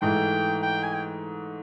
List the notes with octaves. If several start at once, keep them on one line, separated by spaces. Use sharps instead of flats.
G#2 E3 A3 G5
G5
G#5
G5